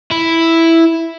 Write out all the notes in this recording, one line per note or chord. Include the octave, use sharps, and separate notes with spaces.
E4